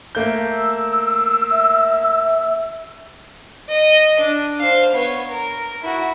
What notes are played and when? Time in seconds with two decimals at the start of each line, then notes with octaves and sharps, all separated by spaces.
0.15 A3 A#3 G6
0.52 E6
1.51 E5
3.68 D#5
4.20 D4
4.59 C5 F5
4.92 B3 C#5
5.29 A#4
5.82 E4 F#4